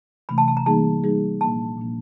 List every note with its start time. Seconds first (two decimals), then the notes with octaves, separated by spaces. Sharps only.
0.29 C3 E3 A3 D4 B5
0.38 A5
0.48 A5
0.57 A#5
0.66 E3 G3 A#3 D#4 G#4 A5
1.03 E3 G3 A#3 D#4 G#4
1.41 A#2 F3 A#3 D4 A5
1.78 A#2 F3 A#3 D4